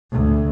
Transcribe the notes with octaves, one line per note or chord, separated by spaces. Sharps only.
D2